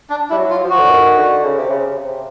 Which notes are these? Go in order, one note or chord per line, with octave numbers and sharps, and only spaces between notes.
D4
G3 E4
F#3
F4
F3
F#4
D3
D#3
D3
C#3
C3
C#3
C3